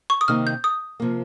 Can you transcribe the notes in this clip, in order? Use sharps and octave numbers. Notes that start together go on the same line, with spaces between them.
C#6
D#6
C3 D#3 A#3 D#4 F6
G6
D#6
C3 F3 A#3